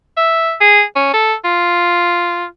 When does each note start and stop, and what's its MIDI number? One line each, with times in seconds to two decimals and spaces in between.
0.17 0.55 76
0.61 0.83 68
0.96 1.10 61
1.13 1.34 69
1.45 2.45 65